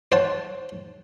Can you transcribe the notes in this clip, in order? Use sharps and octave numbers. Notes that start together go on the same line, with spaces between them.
C5 C#5 F#5 A5